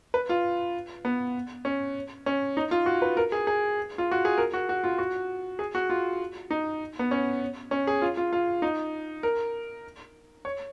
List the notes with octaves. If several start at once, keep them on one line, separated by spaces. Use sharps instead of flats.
B4
F4
B3
C#4
C#4
D#4
F4
F#4
B4
A#4
G#4
G#4
F4
F#4
G#4
A#4
F#4
F#4
F4
F#4
G#4
F#4
F4
D#4
B3
C#4
C#4
G#4
F4
F4
F4
D#4
A#4
C#5